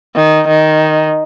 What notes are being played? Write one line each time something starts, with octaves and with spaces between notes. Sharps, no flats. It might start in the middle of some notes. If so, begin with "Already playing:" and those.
D#3
D#3